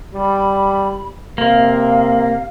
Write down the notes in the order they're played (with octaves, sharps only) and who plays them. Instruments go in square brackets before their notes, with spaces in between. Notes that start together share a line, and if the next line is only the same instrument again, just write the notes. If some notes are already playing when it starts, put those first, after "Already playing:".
[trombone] G3 [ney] B5
[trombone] C3 [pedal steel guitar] A#3 [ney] F5